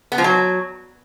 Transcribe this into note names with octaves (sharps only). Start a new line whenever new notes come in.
B3
F3
F#3